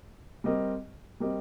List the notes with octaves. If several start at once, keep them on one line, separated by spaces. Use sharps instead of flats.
G3 C4 G4 A#4 D#5
G3 C4 G4 A#4 D#5